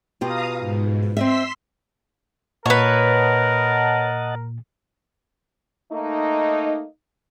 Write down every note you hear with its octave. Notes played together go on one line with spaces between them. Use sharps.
B2 F4 G4 F5 A#5 D#6
G#2
C4 D#5 E5 C6 E6 B6
A#2 A#4 B4 C#5 D#5 F#5 A5
A3 A#3 D#4